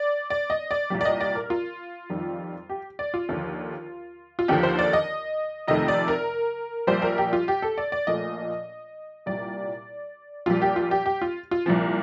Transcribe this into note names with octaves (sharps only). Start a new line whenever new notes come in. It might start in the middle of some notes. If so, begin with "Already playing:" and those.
Already playing: D5
D5
D#5
D5
C2 A#2 G3
D5
D#5
D5
A#4
F4
F2 D#3 G3
G4
D5
F4
D#2 D3 F3
F4
D#2 D3 F3 G4
C5
D5
D#5
F2 C3 D#3 A3 D#5
D5
A#4
A#1 A#2 G3 C5
A#4
G4
F4
G4
A4
D5
D5
A#1 A#2 F3 A3 D#5
C2 A#2 G3 D5
A#1 A#2 G3 F4
G4
F4
G4
G4
F4
F4
C2 A#2 F3